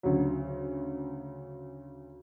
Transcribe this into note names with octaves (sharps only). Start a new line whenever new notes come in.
D2 C#3 F#3